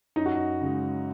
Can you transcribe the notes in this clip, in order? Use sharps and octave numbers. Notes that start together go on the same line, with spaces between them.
F#2 D#4
F#4
D#4
C#3 G#3